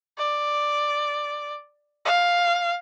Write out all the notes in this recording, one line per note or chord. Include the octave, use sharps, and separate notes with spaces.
D5
F5